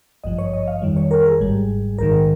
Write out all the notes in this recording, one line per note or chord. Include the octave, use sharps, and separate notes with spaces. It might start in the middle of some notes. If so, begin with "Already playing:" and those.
G#1 G2 F3 D#5
C#5
D#5
F5
F2 D#3 G3
C#5
A#4
G#4
G#1 G#2 G3
A#1 G#2 D#3 A#4